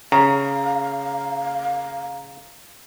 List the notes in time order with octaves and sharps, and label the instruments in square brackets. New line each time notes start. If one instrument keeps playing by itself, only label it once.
[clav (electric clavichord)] C#3 [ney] F5 [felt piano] A#5